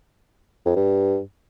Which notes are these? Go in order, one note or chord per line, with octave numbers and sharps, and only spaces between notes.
F2
G2